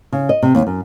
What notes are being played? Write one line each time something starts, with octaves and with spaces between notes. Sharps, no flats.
C#3
D#5
C3
D#2
F#2